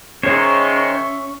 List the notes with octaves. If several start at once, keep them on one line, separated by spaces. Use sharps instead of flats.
D#3 G#3 C#4 C5 C#5 E5 C6 C#6